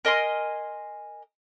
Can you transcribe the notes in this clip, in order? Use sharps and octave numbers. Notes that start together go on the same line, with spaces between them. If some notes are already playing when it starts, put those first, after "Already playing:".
A#4 D#5 G#5 C6